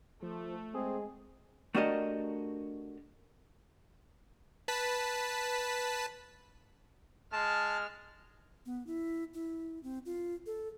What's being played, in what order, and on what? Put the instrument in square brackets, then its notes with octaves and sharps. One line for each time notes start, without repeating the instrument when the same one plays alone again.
[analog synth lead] F3 [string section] A3
[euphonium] G#3 [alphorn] C4 [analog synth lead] G#4
[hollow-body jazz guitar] A3 D4 F#4 G4 A#4 D#5
[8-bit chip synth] B4 A5 B6
[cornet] G#3 [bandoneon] A5 [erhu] F6
[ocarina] B3
E4
E4
C4
F4
A4